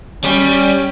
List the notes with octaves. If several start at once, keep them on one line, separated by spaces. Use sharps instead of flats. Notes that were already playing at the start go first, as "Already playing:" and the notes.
G3 C#4